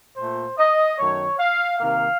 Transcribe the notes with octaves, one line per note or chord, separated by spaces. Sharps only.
A#2 A3 C5
D#5
F#2 D#3 A3 C#5
F5
C3 D#3 A#3 F5